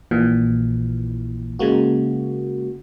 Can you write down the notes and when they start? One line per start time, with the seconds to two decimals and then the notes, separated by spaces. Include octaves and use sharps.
0.11 A#1 A#2 E3
1.59 C#3 G#3 A#3 F#4